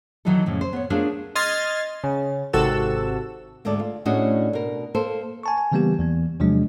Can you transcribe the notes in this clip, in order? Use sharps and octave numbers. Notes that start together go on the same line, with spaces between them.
D#3 E3 F#3 D#4 E4 A4
F2 A2 C#3
C5
B3 C#5
A3 B3 D4 F4 G#4 A#4
D#5 C6 F6 G#6 A6
C#3
G#1 C3 F#4 A4 E6
D2 G#2 G#3 A4 D5
F4
A2 C#4 D4 F#4 G#4 D#5
B2 A#4
A#3 A4 C5
G#5 A5 C#6
G#5
C#3 E3 G3 A#3 B3 G4
E2 E3 B3
E2 C3 F3 F#3 G#3 D4